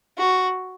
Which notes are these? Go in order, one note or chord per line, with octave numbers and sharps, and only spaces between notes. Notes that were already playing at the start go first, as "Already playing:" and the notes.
F#4